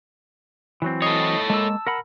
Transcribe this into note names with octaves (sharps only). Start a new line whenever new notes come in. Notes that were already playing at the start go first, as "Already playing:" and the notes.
E3 F#3 C4
A4 C#5 D#5 D#6 C7
G#3 A#3 A5 E6
A#4 F#5 B5